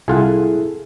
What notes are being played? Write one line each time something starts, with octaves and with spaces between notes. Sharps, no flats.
C2 E4 F4 G#4 A4 F#5